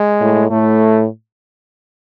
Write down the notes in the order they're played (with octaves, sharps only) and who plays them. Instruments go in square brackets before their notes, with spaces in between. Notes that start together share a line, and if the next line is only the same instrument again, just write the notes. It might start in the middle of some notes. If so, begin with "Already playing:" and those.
Already playing: [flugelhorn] G#3
[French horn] A2
[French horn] A2 [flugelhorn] A3